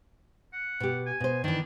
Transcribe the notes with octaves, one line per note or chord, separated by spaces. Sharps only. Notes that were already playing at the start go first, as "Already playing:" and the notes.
F#5
B2 G4
G#5
B2 C5
D#3 E3 D4